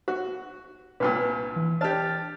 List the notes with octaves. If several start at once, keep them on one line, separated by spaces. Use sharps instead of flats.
F#4
C2 G2 A#2 B4
E3
D4 G4 A5 F6 A6